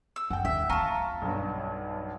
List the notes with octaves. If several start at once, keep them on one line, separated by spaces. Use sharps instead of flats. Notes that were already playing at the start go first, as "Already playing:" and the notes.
E6
F#2 F#5 G5
D#2 E5
B3 F4 A5 A#5 C#6
B1 G2